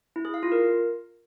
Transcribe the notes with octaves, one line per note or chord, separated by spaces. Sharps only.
E4
G#4
F5
F4
A#4